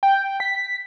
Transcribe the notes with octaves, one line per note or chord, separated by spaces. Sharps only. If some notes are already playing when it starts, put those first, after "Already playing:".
G5
B6